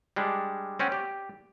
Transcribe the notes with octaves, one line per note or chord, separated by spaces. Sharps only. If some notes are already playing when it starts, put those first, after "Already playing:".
G3 G#3 D4
C4 C#4 F#5 G5
G4 D5